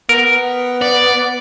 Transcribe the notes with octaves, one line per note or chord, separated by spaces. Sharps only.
B3 A#4
D5